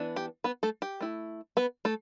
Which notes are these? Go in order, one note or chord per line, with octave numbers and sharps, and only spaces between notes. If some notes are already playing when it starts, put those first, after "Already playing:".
Already playing: E3 B3 D4
G4
B3 B4
A3 A4
G4
A3 E4
B3 B4
A3 A4